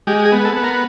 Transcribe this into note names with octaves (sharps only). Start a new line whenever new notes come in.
G#3 G4
G#4
B3
A4
B3
A#4